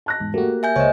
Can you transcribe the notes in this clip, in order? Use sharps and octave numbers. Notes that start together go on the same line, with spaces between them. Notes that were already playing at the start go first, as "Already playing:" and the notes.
A5 F#6 A#6
E2 G#2
A3 A#3 F#4 G4
E5 G#5 G6
C#2 C5 C#5 D#5